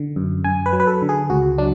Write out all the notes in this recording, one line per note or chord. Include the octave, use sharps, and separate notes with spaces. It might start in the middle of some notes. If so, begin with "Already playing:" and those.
Already playing: D3
F#2
F#2 G#5
B4
F#3
B4
A4
D3
G#4
C#2 F#4
F#3 D4